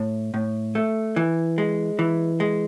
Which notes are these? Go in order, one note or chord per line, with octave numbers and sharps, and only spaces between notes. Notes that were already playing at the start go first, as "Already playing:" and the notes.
Already playing: A2
A2
A3
E3
G#3
E3
G#3